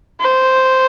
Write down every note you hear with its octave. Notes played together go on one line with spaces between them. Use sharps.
C5